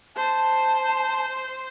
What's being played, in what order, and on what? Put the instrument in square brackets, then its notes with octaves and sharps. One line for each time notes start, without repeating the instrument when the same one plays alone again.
[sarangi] C5 [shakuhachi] A5